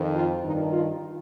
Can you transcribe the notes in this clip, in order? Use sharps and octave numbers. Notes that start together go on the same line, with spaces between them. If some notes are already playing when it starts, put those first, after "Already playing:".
Already playing: F2 D#3
F4
G2 D#3 D#4
F4